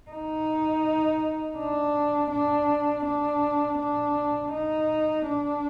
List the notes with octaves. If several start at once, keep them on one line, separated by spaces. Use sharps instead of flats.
D#4
D4
D4
D4
D4
D#4
D4